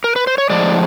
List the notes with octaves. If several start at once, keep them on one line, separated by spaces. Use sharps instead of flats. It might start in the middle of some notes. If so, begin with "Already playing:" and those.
A#4
B4
C5
C#5
A2 F3 G#3 D5